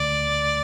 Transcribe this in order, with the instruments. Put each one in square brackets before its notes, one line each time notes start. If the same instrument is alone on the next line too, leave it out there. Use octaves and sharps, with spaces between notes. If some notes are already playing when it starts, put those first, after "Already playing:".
Already playing: [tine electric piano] D2 D3 A3 [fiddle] D5